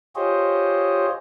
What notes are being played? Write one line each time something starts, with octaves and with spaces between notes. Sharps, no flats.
F4 G4 G#4 C5 C#5 D#5